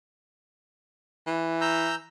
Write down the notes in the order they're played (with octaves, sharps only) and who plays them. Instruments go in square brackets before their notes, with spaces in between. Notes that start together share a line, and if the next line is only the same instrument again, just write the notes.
[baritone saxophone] E3
[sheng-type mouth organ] A#5 E6 G6